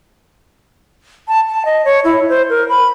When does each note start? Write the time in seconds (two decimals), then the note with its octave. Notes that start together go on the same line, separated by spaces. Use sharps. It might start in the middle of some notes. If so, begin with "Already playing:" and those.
1.28 A5
1.49 A5
1.65 D#5
1.85 C#5
2.04 E4
2.29 C5
2.50 A#4
2.69 B5